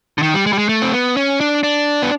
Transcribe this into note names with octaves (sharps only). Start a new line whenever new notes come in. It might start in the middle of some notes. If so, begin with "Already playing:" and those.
D3
D#3
G3
G#3
G3
G#3
A3
C4
B3
C#4
D4
D4
B3